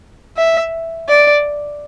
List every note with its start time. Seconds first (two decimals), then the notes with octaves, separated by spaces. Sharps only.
0.37 E5
1.09 D5